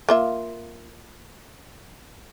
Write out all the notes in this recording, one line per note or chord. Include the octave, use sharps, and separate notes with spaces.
A#3 F4 E5